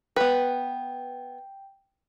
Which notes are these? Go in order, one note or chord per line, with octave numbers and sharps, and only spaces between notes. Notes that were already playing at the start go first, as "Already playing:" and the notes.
B3 B4 G5